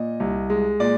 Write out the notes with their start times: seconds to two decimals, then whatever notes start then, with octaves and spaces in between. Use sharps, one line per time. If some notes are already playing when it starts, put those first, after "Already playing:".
Already playing: A#2 D#5
0.20 C2
0.50 G#3
0.80 A#2 D5